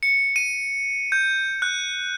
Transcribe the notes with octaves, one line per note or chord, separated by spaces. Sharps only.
C#7
D#7
G6
F#6